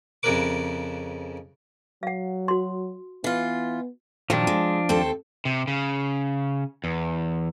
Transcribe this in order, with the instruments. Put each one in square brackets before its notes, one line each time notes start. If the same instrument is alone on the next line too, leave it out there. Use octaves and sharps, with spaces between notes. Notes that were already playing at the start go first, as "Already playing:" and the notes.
[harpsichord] F2 C#3 E4 A#4 B4 D6
[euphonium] F#3 [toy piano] F5 F#5
[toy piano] F#4 C6
[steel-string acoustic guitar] E3 F4 [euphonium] B3
[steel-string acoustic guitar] A#2 D#3 F#3 [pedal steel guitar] F3 D4
[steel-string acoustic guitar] G#3
D#2 C4 A4
[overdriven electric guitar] C3
C#3
E2